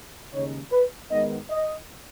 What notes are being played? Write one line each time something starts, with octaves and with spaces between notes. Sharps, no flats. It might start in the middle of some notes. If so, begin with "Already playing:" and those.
D#2 C#3 G#3 D#4 C#5
B4
G#2 D#3 B3 D#5
D#5